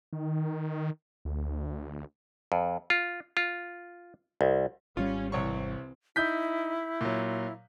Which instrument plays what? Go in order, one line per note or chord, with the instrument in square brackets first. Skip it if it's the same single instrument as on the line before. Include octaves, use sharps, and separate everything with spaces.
[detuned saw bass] D#3
D2
[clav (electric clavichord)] F2
F4
F4
C2
[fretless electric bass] G#1 G3 [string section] C#4 [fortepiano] F4
[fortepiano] C2 C#5 C#6 [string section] E3 C4
[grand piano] D#4 G6 B6 [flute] E4
[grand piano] A#2 F#3